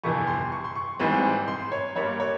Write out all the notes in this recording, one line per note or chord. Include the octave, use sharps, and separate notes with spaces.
G1 F2 C3 E3 C#6
C6
C#6
C6
C#6
G#1 G#2 E3 G3 C4
C6
C#5
G2 G3 A#3 C#5
C#5